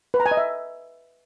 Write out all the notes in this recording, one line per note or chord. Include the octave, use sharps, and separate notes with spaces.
B4
A#5
G#5
D#5
E5